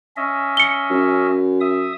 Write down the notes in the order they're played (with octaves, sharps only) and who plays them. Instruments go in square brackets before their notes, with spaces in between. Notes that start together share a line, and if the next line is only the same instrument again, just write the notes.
[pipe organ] C#4 D#5 E5
[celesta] C#7 G7
[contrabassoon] F#2
[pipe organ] E5 D#6